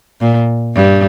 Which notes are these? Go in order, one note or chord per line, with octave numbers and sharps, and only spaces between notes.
A#2
G2